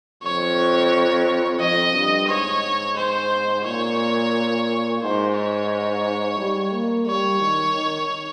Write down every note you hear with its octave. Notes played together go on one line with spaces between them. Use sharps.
F2 C#5
F2 D#5
G2
G#2 C#5
C5
A#2 C#5
G#2 C5
C#5
G3
A#3
G3 C#5
D#3
D#3